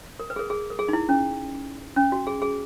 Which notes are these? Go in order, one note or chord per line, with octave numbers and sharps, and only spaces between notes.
A#4
B4
G#4
A#4
G#4
A#4
G#4
D#4
E4
C#4
C#4
F#4
G#4
G#4